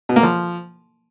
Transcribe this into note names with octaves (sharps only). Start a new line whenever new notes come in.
B2
A#3
F3